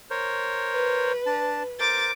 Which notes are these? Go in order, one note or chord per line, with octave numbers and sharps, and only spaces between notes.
A#4 C5 C#5
B4
D4 A5
A#4 C5 D6 A6